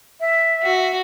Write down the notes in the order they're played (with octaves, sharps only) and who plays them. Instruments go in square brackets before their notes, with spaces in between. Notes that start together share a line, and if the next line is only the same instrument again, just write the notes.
[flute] E5
[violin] F#4